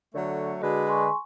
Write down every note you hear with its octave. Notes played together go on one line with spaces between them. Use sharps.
D3 F#3 A3 C#5
D3 G#3 F#4 B4 D5
G#5 C6 C#6